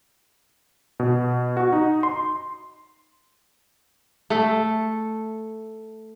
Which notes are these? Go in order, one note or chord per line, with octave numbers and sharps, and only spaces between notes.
B2
F#4
D#4
C6
A3 A4